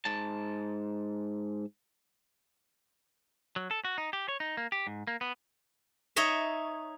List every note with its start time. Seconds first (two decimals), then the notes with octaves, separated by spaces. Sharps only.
0.05 G#2 A5
3.56 F#3
3.71 A4
3.85 F#4
3.98 D#4
4.13 G4
4.28 C#5
4.40 D#4
4.57 A#3
4.72 G4
4.87 G#2
5.07 A#3
5.21 B3
6.16 D#4 C#5 D#5 E5